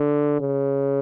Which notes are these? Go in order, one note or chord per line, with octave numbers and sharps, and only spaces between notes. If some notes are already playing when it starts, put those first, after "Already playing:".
Already playing: D3
C#3